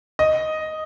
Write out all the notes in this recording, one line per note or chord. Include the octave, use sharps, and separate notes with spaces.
D#5